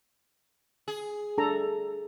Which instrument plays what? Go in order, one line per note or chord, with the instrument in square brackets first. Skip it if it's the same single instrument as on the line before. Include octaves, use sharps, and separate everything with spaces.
[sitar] G#4
[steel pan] D4 A4 A#5